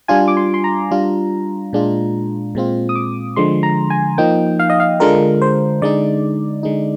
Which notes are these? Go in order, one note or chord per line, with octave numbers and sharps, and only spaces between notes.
G3 D4 F4 G#5
D6
C6
C6
A#5
G3 D4 F4
A#2 G#3 D4 F4
A#2 G#3 C4 F4
D#6
D6
D3 F3 G#3 C6
A#5
G#5
F3 A#3 D#4 G5
F5
D#5
F5
D3 G#3 D4 F4 A#4
C5
D3 G#3 D#4 D5
D3 G#3 D#4